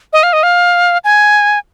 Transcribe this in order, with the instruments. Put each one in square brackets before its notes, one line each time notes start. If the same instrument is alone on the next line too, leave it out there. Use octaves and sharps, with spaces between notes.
[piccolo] D#5
F5
D#5
F5
G#5